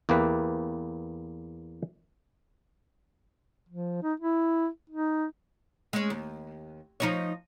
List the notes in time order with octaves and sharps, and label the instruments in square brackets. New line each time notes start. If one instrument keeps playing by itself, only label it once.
[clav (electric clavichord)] E2 A#3 G4 B4 E5
[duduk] F3
D#4
E4
D#4
[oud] G#3 C#4
D#2
F3 D#4 C#5